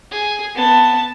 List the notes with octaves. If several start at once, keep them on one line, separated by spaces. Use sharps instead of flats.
G#4
B3 A5